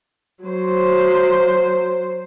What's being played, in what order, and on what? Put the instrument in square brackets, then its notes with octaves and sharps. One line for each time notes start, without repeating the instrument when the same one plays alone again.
[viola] F#3 C5